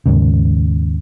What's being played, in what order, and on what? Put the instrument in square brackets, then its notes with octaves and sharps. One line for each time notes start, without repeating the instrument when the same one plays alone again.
[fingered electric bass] D#2 G#2 C#3